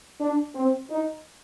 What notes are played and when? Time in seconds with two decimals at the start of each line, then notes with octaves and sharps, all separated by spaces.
0.20 D4
0.54 C4
0.89 D#4